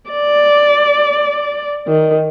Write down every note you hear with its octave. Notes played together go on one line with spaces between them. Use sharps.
D5
D#3